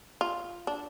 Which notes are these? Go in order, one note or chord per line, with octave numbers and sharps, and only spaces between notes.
F4
D4